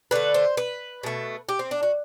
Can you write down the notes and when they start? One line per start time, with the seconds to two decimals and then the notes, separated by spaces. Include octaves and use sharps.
0.11 D3 A3 B4
0.34 C5
0.57 B4
1.03 B2 A3
1.49 G4
1.59 C4
1.71 D4
1.83 F#4